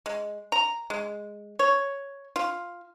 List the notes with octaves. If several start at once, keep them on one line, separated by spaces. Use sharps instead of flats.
G#3
A#5
G#3
C#5
F4